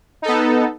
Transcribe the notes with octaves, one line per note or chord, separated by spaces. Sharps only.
B3 D#4 A4